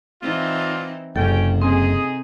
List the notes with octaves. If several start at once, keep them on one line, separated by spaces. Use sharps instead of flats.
E3 C4 D#4 F4 D5 E5
F#1 C3 C#4 A4 G5
C4 D#4 G#4